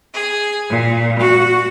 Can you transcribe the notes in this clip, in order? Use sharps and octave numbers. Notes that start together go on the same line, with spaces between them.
G#4
A#2
F#4